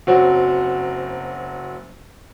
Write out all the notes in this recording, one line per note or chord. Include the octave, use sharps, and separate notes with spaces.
F#1 F#3 C4 F#4